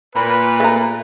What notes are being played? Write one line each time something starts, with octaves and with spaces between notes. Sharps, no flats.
A#2 B4 B5
A3 A#5